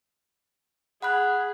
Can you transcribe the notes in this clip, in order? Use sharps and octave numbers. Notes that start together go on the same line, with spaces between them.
G#4 F#5 B5 F#6